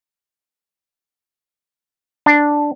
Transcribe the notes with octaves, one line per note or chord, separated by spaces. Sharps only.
D4